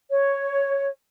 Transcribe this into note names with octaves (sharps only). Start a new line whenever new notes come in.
C#5